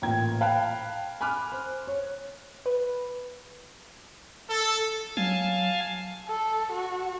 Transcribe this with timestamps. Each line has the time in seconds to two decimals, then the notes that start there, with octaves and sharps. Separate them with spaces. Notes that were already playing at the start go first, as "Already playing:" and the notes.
0.02 A1 A#2 G5 A#5 G#6
0.41 F5 G5 A5 B5 F#6
1.21 G#5 B5 D6 F6 F#6
1.52 C5
1.87 C#5
2.66 B4
4.49 A4
5.17 F#3 F5 G#5 A5
6.28 A4
6.72 F#4